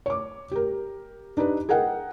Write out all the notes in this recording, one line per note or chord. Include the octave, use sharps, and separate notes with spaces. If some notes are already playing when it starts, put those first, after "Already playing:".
C#5 D6
G4 A#4
D4 D#4 G4 B4
G#4 A#4 D#5 F#5 G5